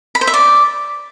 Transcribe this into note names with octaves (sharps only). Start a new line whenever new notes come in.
B5
C5
E5
D5